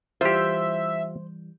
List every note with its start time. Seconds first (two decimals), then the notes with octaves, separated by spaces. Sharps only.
0.21 E3 G3 F4 G4 C5 E5